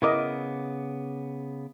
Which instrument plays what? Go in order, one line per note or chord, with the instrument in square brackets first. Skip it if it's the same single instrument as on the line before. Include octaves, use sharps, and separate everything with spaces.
[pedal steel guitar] C#3 B3 D6 [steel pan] E4 A#4 D#5